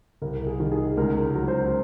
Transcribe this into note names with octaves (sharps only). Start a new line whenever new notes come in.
C2 A#4
G#4
D#3
G#4
C#2 A#4
F#3
C5